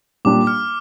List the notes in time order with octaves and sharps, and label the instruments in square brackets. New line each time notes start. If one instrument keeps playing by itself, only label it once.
[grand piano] A#2 G3 D4 [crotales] D6
[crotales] F6